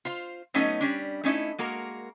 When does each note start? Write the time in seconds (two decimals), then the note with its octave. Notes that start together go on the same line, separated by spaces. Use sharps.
0.05 F4 C5 F5
0.54 F#3 A3 B3 C#4 D#4 D#5
0.81 G3 C#4 D4
1.24 A3 C#4 D#4 E4
1.59 G#3 A#3 F#4 A#4